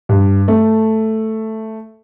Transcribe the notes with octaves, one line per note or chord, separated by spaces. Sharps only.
G2
A3